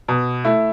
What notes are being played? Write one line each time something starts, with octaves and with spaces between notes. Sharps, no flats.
B2
A3 E4